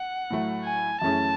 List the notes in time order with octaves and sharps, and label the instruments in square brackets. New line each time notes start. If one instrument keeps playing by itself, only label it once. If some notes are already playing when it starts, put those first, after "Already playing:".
Already playing: [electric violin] F#5
[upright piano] A2 F#3 A3
[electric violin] G#5
[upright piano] F#2 E3 A3 C#4 G#4 [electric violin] A5